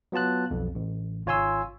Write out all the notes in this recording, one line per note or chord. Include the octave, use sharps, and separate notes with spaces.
F#3 B3 F4 A5 F#6
B1 F2
A1
G#1 F4 C#5 G#5 C6 E6